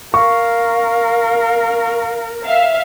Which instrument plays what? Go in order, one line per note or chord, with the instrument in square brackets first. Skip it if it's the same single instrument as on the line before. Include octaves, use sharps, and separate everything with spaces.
[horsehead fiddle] A#4 [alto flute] F5 [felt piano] C#6
[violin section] E5 F5